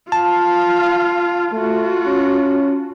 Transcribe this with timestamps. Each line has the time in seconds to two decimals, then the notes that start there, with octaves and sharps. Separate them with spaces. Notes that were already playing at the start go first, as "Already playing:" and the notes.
0.12 F4 F5 A5
1.52 A3 F4 F#4
2.06 C#4